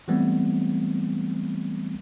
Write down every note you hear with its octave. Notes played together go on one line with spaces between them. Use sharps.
E3 F#3 G3 A3 B3 C4